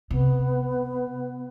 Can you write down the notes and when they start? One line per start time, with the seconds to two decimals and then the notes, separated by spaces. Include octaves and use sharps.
0.11 C3 B3